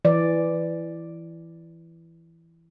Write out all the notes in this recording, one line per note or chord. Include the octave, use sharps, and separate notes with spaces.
E3 D5